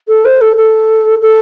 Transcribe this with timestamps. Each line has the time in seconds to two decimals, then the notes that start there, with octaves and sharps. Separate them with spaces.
0.08 A4
0.25 C5
0.41 A4
0.57 A4
1.22 A4